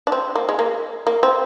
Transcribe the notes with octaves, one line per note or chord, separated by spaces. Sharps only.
D4
C4
A#3
G#3
A#3
A#3
C4